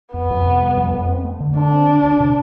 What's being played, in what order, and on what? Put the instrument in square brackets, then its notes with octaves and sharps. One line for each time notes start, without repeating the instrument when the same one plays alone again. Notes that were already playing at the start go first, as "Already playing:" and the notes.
[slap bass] F2 [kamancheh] B3
[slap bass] F2
C3
G3
F2
F2
C4
A3
D3
[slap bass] D3 [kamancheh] D4
[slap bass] C4
D3
D2
C3